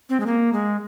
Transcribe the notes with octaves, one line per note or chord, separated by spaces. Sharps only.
C4
G#3
A#3
G#3